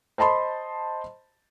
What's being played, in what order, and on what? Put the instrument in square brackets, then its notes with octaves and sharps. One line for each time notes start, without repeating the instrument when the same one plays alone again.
[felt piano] C5 D#5 A5 B5 C6